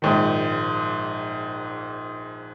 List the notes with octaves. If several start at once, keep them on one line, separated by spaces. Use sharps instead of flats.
A#1 G#2 D#3